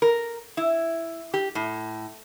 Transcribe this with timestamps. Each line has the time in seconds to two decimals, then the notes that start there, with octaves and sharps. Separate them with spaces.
0.02 A#4
0.57 E4
1.34 G4
1.55 A2